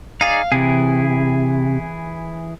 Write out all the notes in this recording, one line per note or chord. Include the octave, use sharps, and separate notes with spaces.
D#4 G#4 D5 F5
C3 E3 E4 G#4